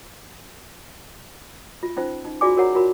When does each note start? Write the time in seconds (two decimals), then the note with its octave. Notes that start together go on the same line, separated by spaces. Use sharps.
1.83 F4
1.97 C#4 D#4 F4 C5
2.25 D#4
2.41 F4 F#4 G#4 D5 G#5 D6
2.57 F#4 A#4 C#5 F#5 A#5
2.75 F4 F#4 A#4 B5